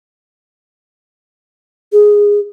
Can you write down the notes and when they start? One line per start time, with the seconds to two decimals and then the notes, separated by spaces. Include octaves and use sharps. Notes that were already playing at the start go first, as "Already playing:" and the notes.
1.93 G#4